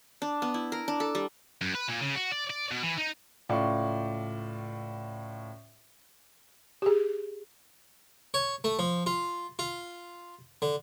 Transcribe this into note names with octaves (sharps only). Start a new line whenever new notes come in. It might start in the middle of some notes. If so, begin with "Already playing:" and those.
D4
B3
E4
A#4
D4
A4
G3
F#2
B4
A#2
C#3
F#4
D5
D5
B2
E3
D#4
C#2 A2 F4 D5 C#6
G4 G#4
C#5
A3
F3
F4
F4
D3